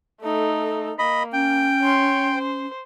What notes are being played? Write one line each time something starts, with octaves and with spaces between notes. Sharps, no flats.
A3 D#4 A4
A#3 D#5 B5
C#4 G5
C#5 C6
C5